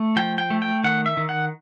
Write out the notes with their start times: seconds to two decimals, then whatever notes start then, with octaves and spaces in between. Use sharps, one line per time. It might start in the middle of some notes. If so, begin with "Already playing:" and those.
Already playing: A3
0.16 F3 G5
0.38 G5
0.50 A3
0.62 G5
0.84 D#3 F#5
1.06 E5
1.17 D#3
1.29 F#5